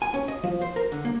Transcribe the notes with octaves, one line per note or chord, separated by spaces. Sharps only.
G#5
C#4
D#5
F3
C5
A#4
D3
A#3